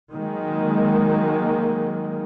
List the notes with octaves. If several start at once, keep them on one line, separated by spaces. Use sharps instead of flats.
D#3 F#3 G#3 A#3